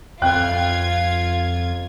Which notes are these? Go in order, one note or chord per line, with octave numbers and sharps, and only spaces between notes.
F2 F4 G5 F#6 G#6